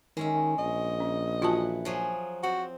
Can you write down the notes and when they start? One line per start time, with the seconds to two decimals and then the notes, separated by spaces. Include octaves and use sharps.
0.17 D#3 G#3 C#4 E5
0.59 A#1 D#5
1.00 C#4
1.42 E3 F4 F#4 F#5 A5
1.85 F3 F#3 G#4
2.43 C4 F#4